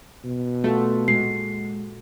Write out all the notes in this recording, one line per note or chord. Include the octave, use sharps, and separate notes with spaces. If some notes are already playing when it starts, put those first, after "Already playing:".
B2
A3 F4 F#4 A4
A#2 G#3 F#4 C7